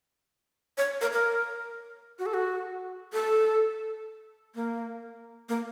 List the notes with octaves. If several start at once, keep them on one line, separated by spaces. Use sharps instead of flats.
C#5
A#4
A#4
F#4
A4
F#4
A4
A#3
A#3